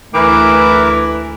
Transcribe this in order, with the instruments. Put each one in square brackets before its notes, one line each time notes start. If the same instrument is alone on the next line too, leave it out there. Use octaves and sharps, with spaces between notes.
[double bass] D2 A3 [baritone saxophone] E3 [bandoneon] E4 A#4 B4 [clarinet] D6